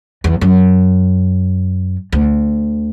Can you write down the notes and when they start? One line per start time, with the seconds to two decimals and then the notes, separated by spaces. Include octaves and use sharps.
0.24 E2
0.41 F#2
2.12 D2